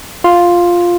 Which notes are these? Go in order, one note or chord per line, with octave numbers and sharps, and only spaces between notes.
F4